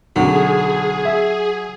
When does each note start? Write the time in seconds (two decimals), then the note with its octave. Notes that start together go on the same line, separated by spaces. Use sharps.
0.16 B1 D3 F#3 G#4
1.05 E5